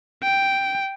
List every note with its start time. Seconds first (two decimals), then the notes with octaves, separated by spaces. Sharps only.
0.23 G5